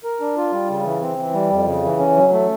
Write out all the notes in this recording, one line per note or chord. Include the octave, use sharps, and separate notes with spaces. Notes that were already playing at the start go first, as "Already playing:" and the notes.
A#4
D4
F4
G3
C#3
E3
C4
E3
G3
F2
C#3
E3
C#4
F#3
A3